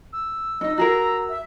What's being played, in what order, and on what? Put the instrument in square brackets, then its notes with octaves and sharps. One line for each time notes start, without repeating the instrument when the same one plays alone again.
[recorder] E6
[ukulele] C#4 D#4 [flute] D#5
[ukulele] F#4 G#4 A#4 [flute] A#5
[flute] E5